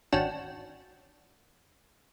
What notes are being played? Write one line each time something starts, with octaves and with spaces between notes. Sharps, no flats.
G#1 C#4 D4 F#4 G5 E7